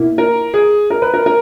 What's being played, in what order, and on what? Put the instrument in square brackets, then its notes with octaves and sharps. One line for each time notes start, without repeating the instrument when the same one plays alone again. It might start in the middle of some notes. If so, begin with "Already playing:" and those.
Already playing: [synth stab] B2 A#3 E4
[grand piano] A#4
G#4
A#4
B4
A#4
A#4